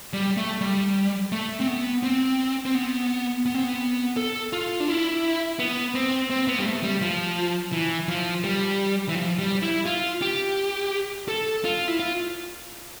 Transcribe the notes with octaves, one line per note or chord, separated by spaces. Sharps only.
G3
A3
G3
A3
C4
B3
C4
C4
B3
B3
C4
B3
A4
F4
D4
E4
B3
C4
C4
B3
G3
A3
G3
F3
E3
F3
G3
E3
F3
G3
E4
F4
G4
A4
F4
E4
F4